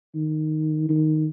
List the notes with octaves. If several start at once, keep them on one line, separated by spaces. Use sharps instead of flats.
D#3
D#3